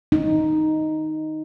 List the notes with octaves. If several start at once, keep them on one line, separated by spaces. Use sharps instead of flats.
D#4